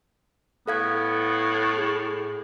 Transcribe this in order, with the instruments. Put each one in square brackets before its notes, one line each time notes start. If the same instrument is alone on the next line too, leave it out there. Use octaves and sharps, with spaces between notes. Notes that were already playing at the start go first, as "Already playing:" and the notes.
[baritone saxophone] A2 [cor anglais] B3 [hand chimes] A4 F5 G#6
[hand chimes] G#4